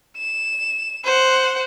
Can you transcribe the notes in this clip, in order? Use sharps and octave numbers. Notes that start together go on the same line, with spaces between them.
E7
C5 F#5